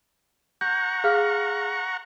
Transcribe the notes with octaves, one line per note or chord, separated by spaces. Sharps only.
F#5 A#5 C#6 G6
G#4 F5 F6